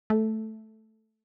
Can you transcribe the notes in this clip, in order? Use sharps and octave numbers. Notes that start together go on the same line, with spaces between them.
A3